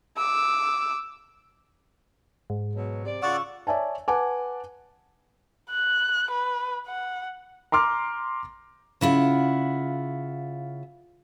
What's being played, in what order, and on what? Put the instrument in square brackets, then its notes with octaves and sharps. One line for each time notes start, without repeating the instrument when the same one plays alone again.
[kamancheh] D6 E6
[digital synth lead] G#2
[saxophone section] B2 F#3
C3 D5
[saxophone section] C#3 F4 [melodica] D5 F#5 D6 [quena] C#6 [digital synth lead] E6
[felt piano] C#5 D5 E5 G#5 A5
B4 F#5 G#5 A5 D6
[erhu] F#6
B4
F#5
[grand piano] A#5 C6 D6 F6
[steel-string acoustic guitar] C#3 E4 F4 F#5